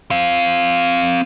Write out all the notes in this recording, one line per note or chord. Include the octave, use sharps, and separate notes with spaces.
C4 F5